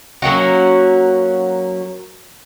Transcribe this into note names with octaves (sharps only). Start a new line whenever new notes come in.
F#3 A#3 C#4 F#4